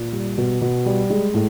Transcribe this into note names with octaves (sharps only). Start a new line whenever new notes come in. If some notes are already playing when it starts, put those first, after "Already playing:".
Already playing: A#2
G3
B2
B2
G3
G#3
A2